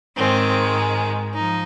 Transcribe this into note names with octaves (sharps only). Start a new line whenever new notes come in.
G#2 D#3 G#3 C4
F3 D#4